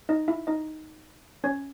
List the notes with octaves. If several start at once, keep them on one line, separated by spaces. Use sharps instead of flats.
D#4 D#5
E4 E5
D#4 D#5
C#4 C#5